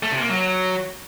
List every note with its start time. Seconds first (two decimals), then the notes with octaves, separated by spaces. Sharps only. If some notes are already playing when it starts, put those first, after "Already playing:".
0.03 A3
0.12 C3
0.20 A#3
0.29 F#3